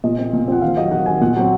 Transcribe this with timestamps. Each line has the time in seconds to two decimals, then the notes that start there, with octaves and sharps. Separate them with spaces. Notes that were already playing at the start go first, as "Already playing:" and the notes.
0.04 A#2 D#5
0.18 F3 C4
0.33 A#2
0.48 F3 C4 F#5
0.62 D#3 F5
0.77 F#3 C4 D#5
0.91 D#3 F#5
1.06 F#3 C4 G#5
1.21 A#2 F#5
1.36 F#3 C4